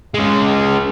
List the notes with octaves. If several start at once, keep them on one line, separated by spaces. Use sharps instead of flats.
G#3 C#4